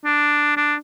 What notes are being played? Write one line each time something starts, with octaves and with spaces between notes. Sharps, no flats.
D4
D4